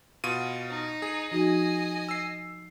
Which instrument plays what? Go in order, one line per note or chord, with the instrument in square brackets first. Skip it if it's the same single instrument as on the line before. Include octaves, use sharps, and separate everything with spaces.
[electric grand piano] B2 F4 D#7
[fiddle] D#4
[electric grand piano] G#4
[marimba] F3 D#4 F#4 [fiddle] D#5 G#5
[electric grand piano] E6 C7